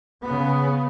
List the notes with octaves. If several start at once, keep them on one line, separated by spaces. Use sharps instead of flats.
C#3 B3